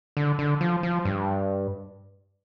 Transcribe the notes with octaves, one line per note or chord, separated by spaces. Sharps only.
D3
D3
F3
F3
G2